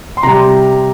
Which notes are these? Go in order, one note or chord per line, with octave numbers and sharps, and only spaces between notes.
C6
C3 G3 A#5